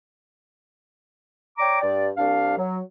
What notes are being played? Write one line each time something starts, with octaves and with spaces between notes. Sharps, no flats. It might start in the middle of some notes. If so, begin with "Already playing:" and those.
C#5 D5 G5 A#5 D6
G2 D5
C2 D4 F5
F#3